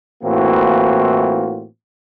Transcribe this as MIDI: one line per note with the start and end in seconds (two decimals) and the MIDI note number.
0.23 1.67 45
0.23 1.67 52
0.23 1.67 58
0.23 1.67 60
0.23 1.67 65
0.23 1.67 66